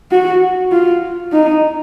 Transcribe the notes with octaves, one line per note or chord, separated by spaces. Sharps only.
F#4
F4
D#4